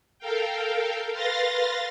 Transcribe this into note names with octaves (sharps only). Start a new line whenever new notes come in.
A4 A#4 F5 G5
B4 F5 C6 A6 A#6